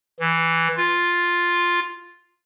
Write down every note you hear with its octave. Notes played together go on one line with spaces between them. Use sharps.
E3
F4